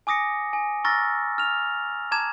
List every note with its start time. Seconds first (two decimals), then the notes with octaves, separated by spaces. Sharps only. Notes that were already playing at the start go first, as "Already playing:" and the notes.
0.07 G#5 D6 D#6 A#6 C#7
0.53 G#5
0.84 A#5 C#6 E6 F6 A6 A#6
1.38 F6 F7
2.12 A5 A#5 D6 G#6 E7